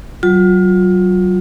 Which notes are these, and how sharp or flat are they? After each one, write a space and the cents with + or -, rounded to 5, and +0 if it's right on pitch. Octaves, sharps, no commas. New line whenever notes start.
F#3 +30 F4 +30